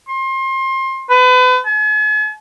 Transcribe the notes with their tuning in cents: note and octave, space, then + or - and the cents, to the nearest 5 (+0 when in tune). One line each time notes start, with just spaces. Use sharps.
C6 +30
B4 +35
G#5 +45